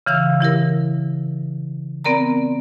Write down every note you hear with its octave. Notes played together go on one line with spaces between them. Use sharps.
C#3 E3 F5 E6
E3 E4 G4 A#4
B3 C4 A#4 D5 A#5